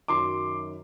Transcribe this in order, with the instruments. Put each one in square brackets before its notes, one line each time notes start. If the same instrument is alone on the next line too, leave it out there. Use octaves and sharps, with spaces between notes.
[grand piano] F#2 D#3 F#3 C6 D6